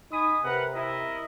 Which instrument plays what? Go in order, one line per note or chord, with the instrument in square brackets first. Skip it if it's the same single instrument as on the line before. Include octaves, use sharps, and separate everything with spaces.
[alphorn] D#4 [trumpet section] G#5 B5 D#6
[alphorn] C3 [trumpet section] A#4 B4 F#5
[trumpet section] E4 A#4 D#5